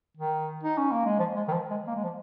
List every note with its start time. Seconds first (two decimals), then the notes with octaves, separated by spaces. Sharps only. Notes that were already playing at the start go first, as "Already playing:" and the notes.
0.17 D#3
0.63 D#4
0.78 C#4
0.91 A#3
1.05 G#3
1.19 F3
1.36 G#3
1.48 D#3
1.53 F3
1.70 G#3
1.87 A#3
1.96 G#3
2.04 F3